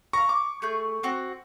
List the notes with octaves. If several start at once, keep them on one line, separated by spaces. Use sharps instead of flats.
F5 A#5 C#6
D6
A3 G#4 G6
C4 F#4